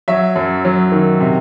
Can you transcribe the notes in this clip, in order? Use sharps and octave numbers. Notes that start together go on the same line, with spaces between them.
F#3 C#5 E5
F#2
F#3
D#3
C3